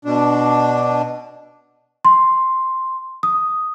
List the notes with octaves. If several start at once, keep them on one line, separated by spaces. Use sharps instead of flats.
B2 D4
C6
D#6